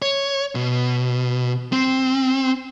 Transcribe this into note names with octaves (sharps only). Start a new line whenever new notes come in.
C#5
B2
C4